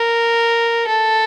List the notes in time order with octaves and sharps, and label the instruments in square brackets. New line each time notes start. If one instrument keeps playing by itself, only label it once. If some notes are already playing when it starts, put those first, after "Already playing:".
Already playing: [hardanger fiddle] A#4
A4